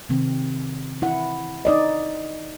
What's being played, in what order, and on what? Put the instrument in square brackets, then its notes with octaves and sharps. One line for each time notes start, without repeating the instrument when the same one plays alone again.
[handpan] C3 D#3 C4
E4 F#5
D#4 D5 D#5